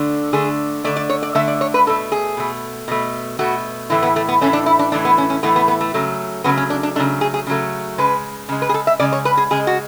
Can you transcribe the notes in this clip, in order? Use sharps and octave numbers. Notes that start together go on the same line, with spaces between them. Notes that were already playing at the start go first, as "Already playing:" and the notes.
Already playing: D3 A3
D3 A3 G#4
D3 A3 D5
D5
C#5
D5
D3 A3 E5
D5
C#5
B4
B2 A3 A4
G#4
B2 A3
B2 A3
B2 A3 F#4
A2 E3 A3 E4
B3
A3
B3
A2 E3 A3 C#4
D4
E4
D4
A2 E3 A3 D4
B3
C#4
C#4
A2 E3 A3 B3
B3
B3
A3
C#3 F#3 A3
C#3 F#3 A3 B3
C#4
D4
D4
C#3 F#3 A3 D4
G#4
G#4
C#3 F#3 A3
C#3 G#3 B4
C#3 G#3
B4
G#4
A4
E5
C#3 G#3 D5
C#5
B4
G#4
C#3 G#3 G#4
F#4